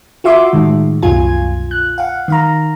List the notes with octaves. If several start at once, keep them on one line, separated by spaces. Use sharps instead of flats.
F4 F#4 E5 C6 D6
A2 D#3 G#3
C2 F#2 B2 F4 G#5 G#6
F#6
F5 F#5
D#3 F5 A#5